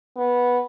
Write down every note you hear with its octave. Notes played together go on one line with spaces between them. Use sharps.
B3